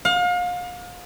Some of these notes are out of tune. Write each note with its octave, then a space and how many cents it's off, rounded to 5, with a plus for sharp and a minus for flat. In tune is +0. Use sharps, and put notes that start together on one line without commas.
F5 +35